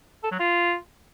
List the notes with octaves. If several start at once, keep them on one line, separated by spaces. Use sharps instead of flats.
A4
F#3
F4